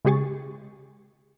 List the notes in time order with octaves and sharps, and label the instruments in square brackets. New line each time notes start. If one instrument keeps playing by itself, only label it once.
[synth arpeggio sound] C#3 G#3 G4 G#4 C#6 A6